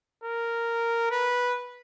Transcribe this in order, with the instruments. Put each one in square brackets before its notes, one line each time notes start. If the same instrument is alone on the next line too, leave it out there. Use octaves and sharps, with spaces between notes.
[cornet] A#4
B4